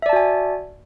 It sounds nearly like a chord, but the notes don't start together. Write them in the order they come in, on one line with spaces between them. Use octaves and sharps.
E5 D5 A5 F#4 G#5